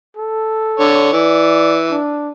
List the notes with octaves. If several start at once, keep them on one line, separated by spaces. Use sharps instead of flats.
A4
D3 C#5
E3 D5
D4